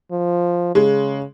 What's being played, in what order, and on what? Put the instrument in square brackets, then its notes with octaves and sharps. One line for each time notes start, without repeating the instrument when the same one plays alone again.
[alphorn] F3
[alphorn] C#3 [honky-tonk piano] G#3